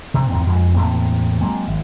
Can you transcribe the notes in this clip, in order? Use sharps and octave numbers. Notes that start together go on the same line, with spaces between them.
C3
E2 G#2 C4
F2 G#3
E2 A2 A#3 C4
F#3 G#3 A#3 C4
G#1